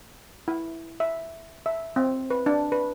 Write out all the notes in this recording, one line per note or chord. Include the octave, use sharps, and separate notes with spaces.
E4
E5
E5
C4
B4
D4
B4